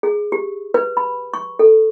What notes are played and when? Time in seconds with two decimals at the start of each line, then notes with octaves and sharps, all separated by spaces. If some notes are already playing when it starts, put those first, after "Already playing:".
0.03 G#4
0.32 G4
0.74 B4
0.97 B5
1.34 C#6
1.59 A4